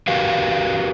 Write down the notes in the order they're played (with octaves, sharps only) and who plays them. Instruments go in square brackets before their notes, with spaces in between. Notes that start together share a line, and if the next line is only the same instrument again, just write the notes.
[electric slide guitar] F#4 G4 A#4 B4 F5